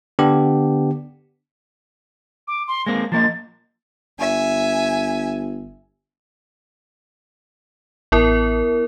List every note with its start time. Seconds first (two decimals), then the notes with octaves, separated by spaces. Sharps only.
0.19 D3 B3 D4 G4
2.48 D6
2.68 C6
2.86 G#3 A#3 C4 A#6
3.12 F3 A#3 D#5 A6
4.19 G1 E5 G#5
8.12 A1 B3 E4 A#4